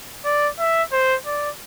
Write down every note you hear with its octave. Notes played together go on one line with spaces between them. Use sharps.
D5
E5
C5
D5